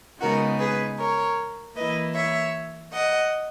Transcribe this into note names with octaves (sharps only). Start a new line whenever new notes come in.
C#3 G#3 B3 D#4 F#4 A#4
G#4 B4
A#4 C#5
E3 A#3 E4 B4 D#5
C#5 E5
D#5 F#5